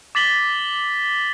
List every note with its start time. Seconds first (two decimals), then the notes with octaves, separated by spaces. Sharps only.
0.15 D6 A6 B6 F#7 G7